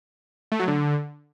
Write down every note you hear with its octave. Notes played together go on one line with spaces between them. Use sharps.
A3
F#3
D3